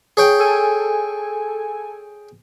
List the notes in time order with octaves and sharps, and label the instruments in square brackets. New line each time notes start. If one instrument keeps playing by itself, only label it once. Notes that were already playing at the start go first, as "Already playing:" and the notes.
[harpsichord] G#4 C#5 G5
[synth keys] A4 G#5